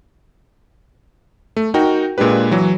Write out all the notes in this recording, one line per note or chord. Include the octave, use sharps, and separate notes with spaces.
A3
D#4 F#4 A#4 G5
A#2 G#3 D4 G4 B4
E3 F#3